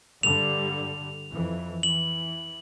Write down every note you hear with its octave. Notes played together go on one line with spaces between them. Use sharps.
G2 D3 G3 F7
F2 E3
E3 F#7